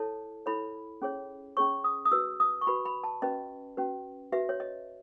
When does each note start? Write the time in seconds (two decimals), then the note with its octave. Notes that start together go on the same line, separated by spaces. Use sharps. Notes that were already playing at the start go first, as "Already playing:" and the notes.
Already playing: E4 A4 C#5 A5
0.46 E4 A4 C#5 B5
1.02 C#4 G#4 C#5
1.57 C#4 G#4 C#5 C#6
1.84 D#6
2.05 D#6
2.12 F#4 B4 E6
2.40 D#6
2.61 C#6
2.67 F#4 B4 B5
2.85 B5
3.04 A5
3.22 C#4 F#4 B4 D#5
3.77 C#4 F#4 B4
4.32 F#4 B4 E5
4.49 C#5
4.60 D#5